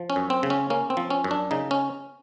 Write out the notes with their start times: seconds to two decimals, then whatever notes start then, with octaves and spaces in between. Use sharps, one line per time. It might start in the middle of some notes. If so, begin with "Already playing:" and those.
Already playing: F3
0.10 C#4
0.16 F#2
0.30 C4
0.43 C#3
0.50 C#4
0.70 A#3 C#4
0.90 C4
0.97 F3
1.10 C#4
1.24 F#2
1.31 D4
1.51 C#3 D#4
1.71 C#4